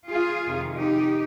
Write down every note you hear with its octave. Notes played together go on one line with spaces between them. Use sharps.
F4 G#4
F2 C3 D#3
D#4 G4